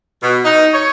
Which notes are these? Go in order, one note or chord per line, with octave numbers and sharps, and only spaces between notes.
B2
D#4
C#5